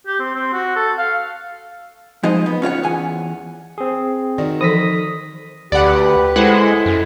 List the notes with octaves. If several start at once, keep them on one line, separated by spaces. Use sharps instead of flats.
G4
C4
C4
F#4
A4
F5
F3 G#3 D#4 C5 D#5
B3
C#4 F4 C#5 F#5
E2 F#5 G#5
C4 G#4
D#3 F#4 D5
E3 F3 A4 D#6 A#6 B6
D2 G4 B4 D5 F#5
G#3 E4 A4 C5 F#5
F#2